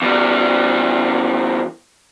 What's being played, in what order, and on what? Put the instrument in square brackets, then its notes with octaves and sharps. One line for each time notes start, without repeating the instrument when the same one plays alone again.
[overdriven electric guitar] E2 G3